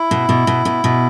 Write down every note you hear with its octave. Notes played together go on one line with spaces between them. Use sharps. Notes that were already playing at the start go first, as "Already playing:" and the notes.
Already playing: E4
B2
B2
B2
B2
B2